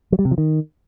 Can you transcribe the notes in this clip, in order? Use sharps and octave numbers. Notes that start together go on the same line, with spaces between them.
F#3
G3
C3
F3
D#3